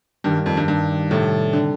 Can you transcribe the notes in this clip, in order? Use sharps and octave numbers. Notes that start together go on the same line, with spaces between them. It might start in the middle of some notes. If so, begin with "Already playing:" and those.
G2 D#3 G3 A#3 D4
F2
G2
G2
A2 C3 G3 D4 A4
D3